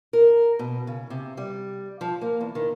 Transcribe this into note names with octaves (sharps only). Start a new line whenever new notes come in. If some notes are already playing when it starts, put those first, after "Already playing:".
A#4
B2
C#3
C3
G3
F3
A#3
E2
D#3